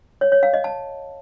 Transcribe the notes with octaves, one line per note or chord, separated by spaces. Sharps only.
C#5
C#5
F5
D#5
A5